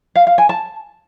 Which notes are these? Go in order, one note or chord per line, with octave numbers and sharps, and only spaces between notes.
F5
F5
G#5
A5